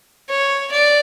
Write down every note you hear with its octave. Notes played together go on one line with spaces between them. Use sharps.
C#5
D5